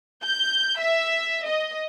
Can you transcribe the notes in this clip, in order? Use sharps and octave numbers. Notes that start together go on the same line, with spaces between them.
G6
E5
D#5